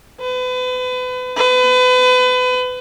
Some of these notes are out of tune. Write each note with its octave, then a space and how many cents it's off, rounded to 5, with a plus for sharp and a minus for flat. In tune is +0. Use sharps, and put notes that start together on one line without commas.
B4 +35
B4 +30